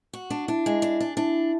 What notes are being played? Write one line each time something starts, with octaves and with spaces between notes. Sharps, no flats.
F#4
D4
D4 E4
G#3
D4
D4
D4 E4